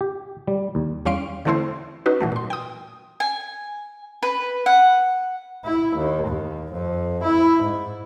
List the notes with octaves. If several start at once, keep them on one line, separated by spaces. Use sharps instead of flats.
G4
G3
D#2
E2 G3 C#4 F5 C6 D7
D3 E3 A3 C4 E4 C5
C#4 D#4 F#4 B4
A#2 E3 F#3 A3
A#2 C6
G5 D#6
G#5
B4
F#5
E4
D#2
D#2
F2
E4
G#2